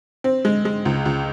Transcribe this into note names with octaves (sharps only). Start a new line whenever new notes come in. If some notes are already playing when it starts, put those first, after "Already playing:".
C4
G#3
G#3
C#2
C#2